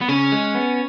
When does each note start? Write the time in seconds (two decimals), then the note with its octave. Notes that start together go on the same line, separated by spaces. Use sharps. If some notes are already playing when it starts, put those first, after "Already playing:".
0.02 B3
0.09 C#3 C#4
0.32 G#3
0.55 B3